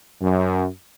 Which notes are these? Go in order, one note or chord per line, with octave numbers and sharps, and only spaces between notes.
F#2